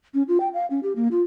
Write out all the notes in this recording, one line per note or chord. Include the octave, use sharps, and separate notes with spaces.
C#4
F4
G5
F5
C#4
G4
A#3
F4